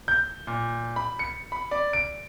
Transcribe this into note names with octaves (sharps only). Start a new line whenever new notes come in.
G6
A#2
B5
C#7
B5
D5
D7